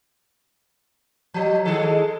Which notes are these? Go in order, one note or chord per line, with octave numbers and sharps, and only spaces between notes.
F3
D#3 G#3 A4